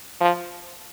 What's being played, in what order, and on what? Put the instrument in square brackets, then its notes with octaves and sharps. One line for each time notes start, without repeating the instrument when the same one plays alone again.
[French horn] F3